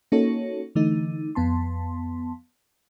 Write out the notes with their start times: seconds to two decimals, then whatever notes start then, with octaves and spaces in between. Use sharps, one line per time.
0.12 A#3 C#4 D#4 F#4 A4 C#5
0.75 D3 E3 A3 D#4
1.35 F2 B3 A5 C6